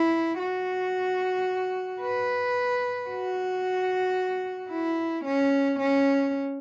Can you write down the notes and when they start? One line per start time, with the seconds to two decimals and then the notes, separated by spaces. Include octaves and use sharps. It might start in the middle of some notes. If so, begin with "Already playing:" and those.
Already playing: E4
0.39 F#4
2.01 B4
3.09 F#4
4.70 E4
5.25 C#4
5.79 C#4